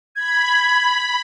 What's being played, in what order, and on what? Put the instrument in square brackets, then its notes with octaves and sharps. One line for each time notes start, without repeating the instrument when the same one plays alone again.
[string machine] B5 [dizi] G#6